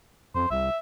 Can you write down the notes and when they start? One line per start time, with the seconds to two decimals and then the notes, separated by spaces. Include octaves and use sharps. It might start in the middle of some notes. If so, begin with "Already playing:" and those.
0.35 F2 C5
0.51 C2 E5